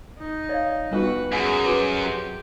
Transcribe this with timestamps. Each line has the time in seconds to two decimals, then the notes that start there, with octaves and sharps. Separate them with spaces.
0.18 D#4
0.49 C#5 D5 F5
0.91 G3 B3 F4 F#4 B4
1.32 F#2 G#4 F#5 G#5 F7
1.63 F#4 B4 D6
1.98 G4 C6